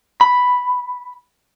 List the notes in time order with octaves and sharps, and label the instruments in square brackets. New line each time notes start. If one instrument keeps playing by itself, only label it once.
[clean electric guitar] B5